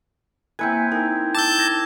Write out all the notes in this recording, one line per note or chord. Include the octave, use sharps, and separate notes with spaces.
A#3 C4 E4 B4 G#5 G6 G#6
D#4 A#4
A5 D6 E6 G6
G#6 A#6